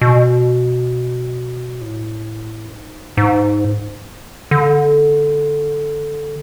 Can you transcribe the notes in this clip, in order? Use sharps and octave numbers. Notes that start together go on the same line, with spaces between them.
B2
A2
F#2
G#2
G#2
D3